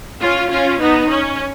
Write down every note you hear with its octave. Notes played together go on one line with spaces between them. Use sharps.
C#4 F4
C#4 F4
B3 D#4
C#4